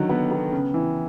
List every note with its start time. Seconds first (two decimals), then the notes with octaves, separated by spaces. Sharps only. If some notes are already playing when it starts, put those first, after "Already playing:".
Already playing: D3 D#3 F#3
0.09 B3
0.31 B3
0.52 C#3
0.74 E3